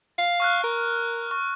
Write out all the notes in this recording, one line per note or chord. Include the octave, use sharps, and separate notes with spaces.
F5
C#6 F6 F#6
A#4
C#6